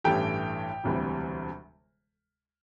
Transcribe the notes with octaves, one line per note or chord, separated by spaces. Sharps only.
A1 G2 E3 A3 G4 G5
E1 D2 C3 E3 G3